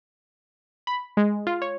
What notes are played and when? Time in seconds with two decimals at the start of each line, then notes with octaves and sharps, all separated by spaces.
0.87 B5
1.17 G#3
1.47 F4
1.62 C#5